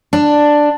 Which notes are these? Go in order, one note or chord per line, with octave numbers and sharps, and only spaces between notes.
D4